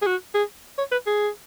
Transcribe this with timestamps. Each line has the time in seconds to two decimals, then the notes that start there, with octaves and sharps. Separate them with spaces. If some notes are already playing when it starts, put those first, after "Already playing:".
0.02 G#4
0.06 F#4
0.34 G#4
0.78 C#5
0.91 B4
1.07 G#4